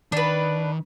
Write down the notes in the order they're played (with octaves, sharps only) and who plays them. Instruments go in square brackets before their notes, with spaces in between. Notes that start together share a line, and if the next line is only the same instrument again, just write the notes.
[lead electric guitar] D#3 [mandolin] D4 B4